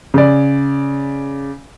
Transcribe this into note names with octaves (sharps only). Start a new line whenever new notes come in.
C#3 D5